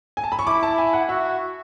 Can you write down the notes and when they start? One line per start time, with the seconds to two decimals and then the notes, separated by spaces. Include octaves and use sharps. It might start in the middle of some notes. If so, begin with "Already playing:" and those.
0.17 G#5
0.24 A5
0.32 B5
0.39 C#6
0.47 E4 D6
0.63 A5
0.78 G#5
0.93 F#5
1.09 F#4 E5